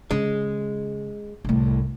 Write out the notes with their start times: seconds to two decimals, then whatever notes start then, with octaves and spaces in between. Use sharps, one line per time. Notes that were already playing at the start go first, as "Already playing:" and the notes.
0.11 C#3 G#3
1.45 C2 A2